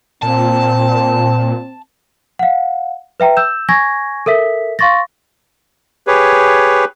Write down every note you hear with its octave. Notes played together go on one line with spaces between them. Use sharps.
A#2 C4 A5
F5 F#5
B4 E5 G5 A#5
E6 G6 E7
G#5 C#6 G#6 A#6
A4 A#4 E5 B6
F5 C6 C#6 A6 A#6
G4 G#4 B4 C#5